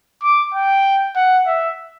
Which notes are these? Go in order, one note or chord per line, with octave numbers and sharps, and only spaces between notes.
D6
G5
F#5
E5